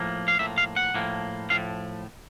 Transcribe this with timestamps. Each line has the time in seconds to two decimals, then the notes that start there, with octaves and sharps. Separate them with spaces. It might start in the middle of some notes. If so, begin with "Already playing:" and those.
Already playing: A2 F3 A#3
0.28 F5
0.39 A2 F3 A#3 E5
0.58 F5
0.76 F#5
0.94 A2 F3 A#3
1.50 A2 F3 F5